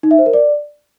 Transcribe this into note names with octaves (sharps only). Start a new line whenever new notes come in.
D#4
E5
C5
A#4
D5